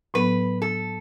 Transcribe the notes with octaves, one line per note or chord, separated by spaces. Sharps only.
A2 F#3 B3 B4
A4